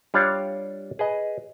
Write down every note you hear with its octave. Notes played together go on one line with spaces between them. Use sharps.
G3 D4 F4 C#5 D5 F5
G#4 B4 D#5